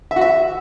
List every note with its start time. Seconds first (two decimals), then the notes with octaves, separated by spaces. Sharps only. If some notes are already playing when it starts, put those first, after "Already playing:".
0.11 E5
0.16 F#4
0.21 E5